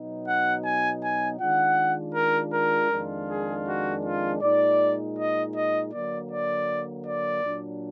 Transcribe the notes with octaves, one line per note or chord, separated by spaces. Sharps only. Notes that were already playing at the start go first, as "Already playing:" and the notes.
Already playing: B2 F#3 B3 D#4
F#5
G#5
G#5
D#3 G#3 D4 F4 F#5
A#4
A#4
F2 D#3 G#3 D4 F4
G#4
F#4
F4
A#2 G#3 D#4 D5
D#5
D#5
D3 F#3 A#3 D5
D5
D5
A#2 F#3 D4